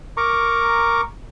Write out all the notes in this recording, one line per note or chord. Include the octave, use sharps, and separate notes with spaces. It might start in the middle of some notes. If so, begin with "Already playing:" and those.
A#4 A#5 C#6 D6